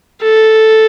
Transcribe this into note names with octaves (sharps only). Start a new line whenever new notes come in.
A4